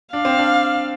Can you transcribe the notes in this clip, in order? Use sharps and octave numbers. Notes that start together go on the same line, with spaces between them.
D4 F5
C4
D4